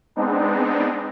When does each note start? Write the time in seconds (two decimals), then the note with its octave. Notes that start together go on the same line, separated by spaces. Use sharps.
0.16 G#3 B3 C4 D4 D#4